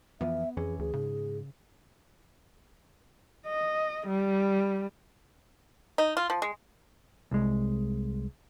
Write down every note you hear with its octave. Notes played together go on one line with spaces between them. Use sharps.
F2 E3 F3 B3 E5
F2 E3 C#4 G#4
D2 G#4
G#2 C#3
D#5
G3
D#4
F4
F3
G#3
C2 G#3